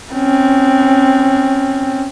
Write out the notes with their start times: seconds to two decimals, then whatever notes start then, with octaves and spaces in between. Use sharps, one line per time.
0.12 C4 C#4